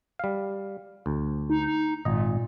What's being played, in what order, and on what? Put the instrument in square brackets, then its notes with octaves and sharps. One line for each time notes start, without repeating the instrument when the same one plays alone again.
[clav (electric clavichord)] G3 F5
D2
[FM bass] D#4
[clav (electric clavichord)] G#1 D#5 [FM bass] A#2